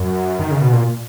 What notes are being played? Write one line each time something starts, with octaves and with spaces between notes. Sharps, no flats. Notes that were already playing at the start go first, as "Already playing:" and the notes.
Already playing: F#2
D#3
C#3
B2
A#2